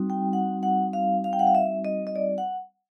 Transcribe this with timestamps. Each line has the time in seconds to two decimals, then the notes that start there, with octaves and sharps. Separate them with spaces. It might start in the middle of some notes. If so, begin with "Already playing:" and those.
Already playing: G3 C4 D#4 F#4
0.10 G5
0.33 F#5
0.63 F#5
0.93 F5
1.24 F5
1.33 G5
1.39 F#5
1.47 F5
1.55 E5
1.85 D#5
2.07 D#5
2.16 D5
2.38 F#5